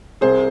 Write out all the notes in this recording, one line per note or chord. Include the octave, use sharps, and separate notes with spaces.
C2 G#4 C5